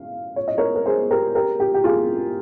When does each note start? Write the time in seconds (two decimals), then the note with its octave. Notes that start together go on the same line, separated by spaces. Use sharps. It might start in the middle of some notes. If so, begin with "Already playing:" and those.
Already playing: F5
0.36 C#5
0.48 D#5
0.58 A#4 C#5
0.76 A#4
0.86 G#4 C5
1.10 G4 A#4
1.35 G4 A#4
1.60 G4
1.74 G4
1.84 F4 G#4